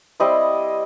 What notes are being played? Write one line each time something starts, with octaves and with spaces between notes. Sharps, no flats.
G3 C4 E4 D#5